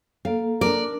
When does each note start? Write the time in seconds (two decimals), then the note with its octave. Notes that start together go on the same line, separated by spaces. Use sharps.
0.25 A#3 A4 F5
0.61 D4 A#4 D5